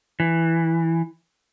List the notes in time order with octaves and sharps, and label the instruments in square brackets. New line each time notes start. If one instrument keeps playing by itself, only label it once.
[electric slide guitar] E3